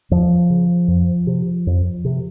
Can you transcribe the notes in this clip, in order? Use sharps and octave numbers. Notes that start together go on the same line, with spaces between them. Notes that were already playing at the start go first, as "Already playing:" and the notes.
E2 F3
C#3
F2
C3
F2
C3